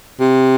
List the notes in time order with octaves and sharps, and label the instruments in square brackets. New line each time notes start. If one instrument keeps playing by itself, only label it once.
[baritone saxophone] C3